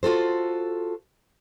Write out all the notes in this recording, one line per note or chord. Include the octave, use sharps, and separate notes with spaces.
F4 F#4 A4 C5